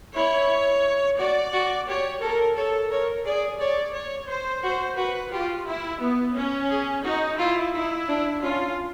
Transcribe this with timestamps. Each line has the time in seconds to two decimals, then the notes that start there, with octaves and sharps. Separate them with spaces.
0.16 E4 C#5
1.19 F#4 D5
1.53 F#4
1.88 G4 C#5
2.22 A4 A#4
2.57 A4 C#5
2.91 A#4 C#5
3.26 G#4 D5
3.60 C#5 D5
3.94 C#5
4.29 C5
4.63 F#4 C5
4.97 F#4 B4
5.32 F4 G4
5.67 E4
6.01 B3
6.36 C#4
6.70 G#4
7.04 D#4 F#4
7.39 E4 F4
7.73 D#4 E4
8.08 D4
8.42 C#4 F4